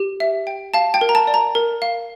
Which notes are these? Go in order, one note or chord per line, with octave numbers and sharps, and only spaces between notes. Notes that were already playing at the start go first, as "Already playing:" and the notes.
Already playing: G4
E5
G5
F5 A5
G5
A#4
A#5
A5
D5
A#5
A#4
F5